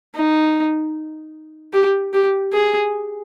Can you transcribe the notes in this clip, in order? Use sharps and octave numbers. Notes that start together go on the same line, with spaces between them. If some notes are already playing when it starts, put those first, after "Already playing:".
D#4
G4
G4
G#4